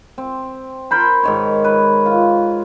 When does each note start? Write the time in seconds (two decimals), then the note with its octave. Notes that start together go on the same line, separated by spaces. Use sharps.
0.18 C4
0.91 A#4 C5 B5
1.23 G#2 D#3 C#5
1.64 B4
2.06 F4